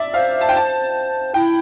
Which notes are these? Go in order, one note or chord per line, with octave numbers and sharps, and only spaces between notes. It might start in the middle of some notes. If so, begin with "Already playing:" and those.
Already playing: D5 E5
C5 F5
A5
G5
A5
E4 G5